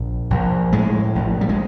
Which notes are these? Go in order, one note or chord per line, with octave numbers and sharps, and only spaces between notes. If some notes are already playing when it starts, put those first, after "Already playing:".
Already playing: A#1
A#1
A2 G#3
A#1
G3
G#3